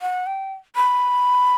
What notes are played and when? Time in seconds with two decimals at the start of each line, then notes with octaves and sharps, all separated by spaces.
0.02 F#5
0.26 G5
0.76 B5